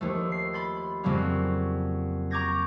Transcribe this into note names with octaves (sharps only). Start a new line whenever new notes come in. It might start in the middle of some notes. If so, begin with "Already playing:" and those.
D#2 F3 A3
C7
B5 C6 A6
F2 C#3 F#3 G3 A#3 C#4
A#5 C#6 D6 G6 G#6 A#6